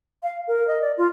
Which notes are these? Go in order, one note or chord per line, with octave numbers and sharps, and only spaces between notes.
F5
A#4
D#5
D5
F4